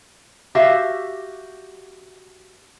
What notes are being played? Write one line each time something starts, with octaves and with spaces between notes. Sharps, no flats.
F#4 G4 E5 F5